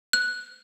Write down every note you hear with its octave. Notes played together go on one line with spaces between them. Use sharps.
F#6